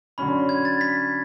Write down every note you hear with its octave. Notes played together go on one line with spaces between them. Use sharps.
D3 F#3 C#4 B5
G#6
A6
B6